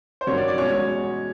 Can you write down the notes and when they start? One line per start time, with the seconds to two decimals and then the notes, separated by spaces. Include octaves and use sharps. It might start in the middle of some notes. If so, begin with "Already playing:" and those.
0.21 C5
0.27 G2 D#3 F#3 A#3 C#4 C#5
0.37 D5
0.48 D5
0.57 E2 B2 G#3 C#4 C#5